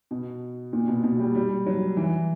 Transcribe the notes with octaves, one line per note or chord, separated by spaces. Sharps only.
B2
A#2
B2
B2
G3
G3
F#3
E3